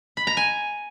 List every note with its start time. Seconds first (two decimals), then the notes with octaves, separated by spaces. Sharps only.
0.17 B5
0.27 A#5
0.37 G#5